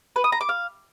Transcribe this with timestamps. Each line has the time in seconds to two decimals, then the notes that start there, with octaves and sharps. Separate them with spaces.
0.16 B4
0.24 D#6
0.32 A#5
0.41 D6
0.49 F5